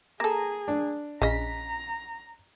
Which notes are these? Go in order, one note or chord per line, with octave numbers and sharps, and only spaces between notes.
A#3 G#4 A4 A#5
D4
A#1 C#3 D#5 A#5 B6